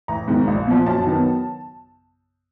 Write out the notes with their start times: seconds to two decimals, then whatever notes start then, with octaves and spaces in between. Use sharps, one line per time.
0.08 A1 A#5
0.28 G#2 D#3
0.47 A#1
0.67 A#2 F3
0.86 F#2 A5
1.07 D#3 F#3 B3